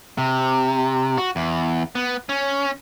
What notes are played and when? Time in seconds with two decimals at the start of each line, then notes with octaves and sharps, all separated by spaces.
0.18 C3
1.18 F#4
1.36 E2
1.95 B3
2.29 C#4